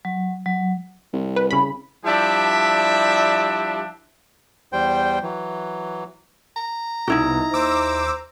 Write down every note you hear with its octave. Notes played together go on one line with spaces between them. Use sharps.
F#3
F#3
C2
B4
C#3 B5
F3 G3 D4 E4 G4 E5
E2 G3 C5 G5
E3 F#3
A#5
C2 B2 D#4 E4 F#4
D#2 C5 D6 E6